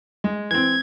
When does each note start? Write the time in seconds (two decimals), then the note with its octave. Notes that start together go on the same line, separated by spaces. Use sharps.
0.24 G#3
0.51 E3 C4 G#6